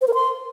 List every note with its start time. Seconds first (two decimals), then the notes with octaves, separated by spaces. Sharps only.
0.01 C5
0.08 A#4
0.14 C6